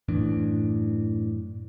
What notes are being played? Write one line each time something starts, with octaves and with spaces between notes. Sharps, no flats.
F#2 A2 E3 D4